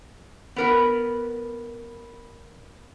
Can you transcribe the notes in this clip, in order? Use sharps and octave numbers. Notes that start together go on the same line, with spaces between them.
B3 A#4 B4